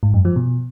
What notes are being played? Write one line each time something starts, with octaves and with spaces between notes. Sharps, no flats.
G#2
F#2
F3
B2